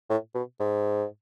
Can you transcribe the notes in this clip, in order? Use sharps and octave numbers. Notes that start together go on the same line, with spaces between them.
A2
B2
G#2